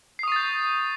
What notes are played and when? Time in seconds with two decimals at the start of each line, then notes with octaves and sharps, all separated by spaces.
0.19 C7
0.23 D#6
0.28 C#6
0.32 A6
0.36 G6